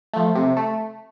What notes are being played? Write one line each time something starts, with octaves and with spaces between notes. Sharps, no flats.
F3 A3
C3
A3